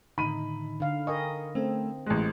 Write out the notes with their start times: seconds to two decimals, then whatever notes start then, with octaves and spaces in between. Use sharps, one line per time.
0.18 A2 D3 D#3 D#4 B5 D#7
0.80 D3 F5
1.07 A#4 D#5 G5 G#5 C#6
1.55 A3 C4 C#4 A4
2.06 A1 G#3 F#6